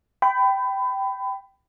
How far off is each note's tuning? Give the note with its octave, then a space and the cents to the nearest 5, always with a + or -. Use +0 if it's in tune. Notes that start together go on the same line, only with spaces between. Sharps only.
G5 -10 B5 +25